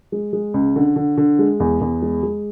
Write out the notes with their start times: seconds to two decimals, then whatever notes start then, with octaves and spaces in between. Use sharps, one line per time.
0.12 G#3
0.33 G#3
0.54 C#2
0.76 D3
0.96 D3
1.17 D3
1.39 G#3
1.60 E2
1.81 E2
2.02 G#3
2.23 G#3